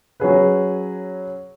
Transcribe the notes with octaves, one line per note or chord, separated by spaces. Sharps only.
F#3 C#4 G#4 B4